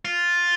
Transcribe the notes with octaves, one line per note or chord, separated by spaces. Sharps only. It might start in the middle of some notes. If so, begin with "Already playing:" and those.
F4